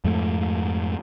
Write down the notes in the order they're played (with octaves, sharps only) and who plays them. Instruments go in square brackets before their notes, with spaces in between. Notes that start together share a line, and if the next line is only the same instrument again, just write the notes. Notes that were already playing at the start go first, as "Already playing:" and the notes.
[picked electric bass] F2 G#2 A3